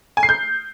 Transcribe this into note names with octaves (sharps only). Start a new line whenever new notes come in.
G#5
C7
G6